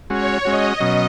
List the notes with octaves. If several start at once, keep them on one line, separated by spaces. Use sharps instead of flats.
G#3 C#4 F#4 C#5
G#3 C#4 F#4 D#5
B2 F#3 C#4